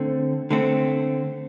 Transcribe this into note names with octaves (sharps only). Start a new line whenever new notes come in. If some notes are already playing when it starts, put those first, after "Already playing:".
Already playing: D3 A3 C4
D3 A3 C4